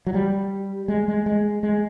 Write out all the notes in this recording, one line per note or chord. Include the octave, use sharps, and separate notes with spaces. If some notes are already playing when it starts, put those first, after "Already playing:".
F#3
G3
G#3
G#3
G#3
G#3